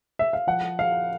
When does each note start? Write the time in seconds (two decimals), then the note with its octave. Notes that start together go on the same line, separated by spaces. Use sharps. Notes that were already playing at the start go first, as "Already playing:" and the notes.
0.19 E5
0.33 F5
0.47 F3 F#5
0.79 F5